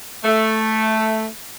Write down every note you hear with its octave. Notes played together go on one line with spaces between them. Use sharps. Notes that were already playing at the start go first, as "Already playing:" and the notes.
A3